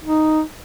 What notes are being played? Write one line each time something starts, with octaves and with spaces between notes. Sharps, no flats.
D#4